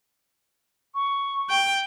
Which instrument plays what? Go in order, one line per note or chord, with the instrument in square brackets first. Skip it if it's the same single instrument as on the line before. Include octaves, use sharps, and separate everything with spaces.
[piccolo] C#6
[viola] G5